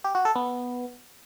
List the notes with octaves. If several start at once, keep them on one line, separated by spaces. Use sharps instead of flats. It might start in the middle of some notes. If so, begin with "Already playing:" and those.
G4
F#4
A4
B3